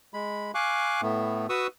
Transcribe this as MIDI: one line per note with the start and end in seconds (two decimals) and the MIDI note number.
0.14 0.51 56
0.14 0.51 83
0.55 1.01 77
0.55 1.01 80
0.55 1.01 85
0.55 1.01 86
0.55 1.01 90
1.02 1.47 45
1.02 1.47 57
1.02 1.47 59
1.49 1.67 66
1.49 1.67 71
1.49 1.67 85
1.49 1.67 87
1.49 1.67 88